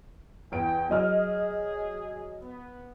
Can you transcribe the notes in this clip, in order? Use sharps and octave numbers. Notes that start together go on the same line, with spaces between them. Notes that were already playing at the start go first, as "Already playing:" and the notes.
E2 G5 D7
F#3 G#4 D#5 F6
B3